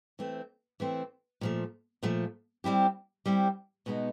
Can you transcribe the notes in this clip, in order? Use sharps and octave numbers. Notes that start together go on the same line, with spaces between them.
E3 A3 C4
E3 A3 C4
A#2 F3 A3
A#2 F3 A3
G3 C4 E4 G4
G3 C4 E4 G4
B2 G#3 B3 D#4